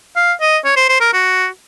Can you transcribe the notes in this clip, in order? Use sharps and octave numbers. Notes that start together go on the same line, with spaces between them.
F5
D#5
C#5
C5
C5
A#4
F#4